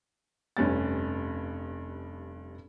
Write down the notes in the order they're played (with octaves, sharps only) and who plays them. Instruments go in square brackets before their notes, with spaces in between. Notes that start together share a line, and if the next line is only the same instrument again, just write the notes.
[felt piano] F1 G2 C#4 A6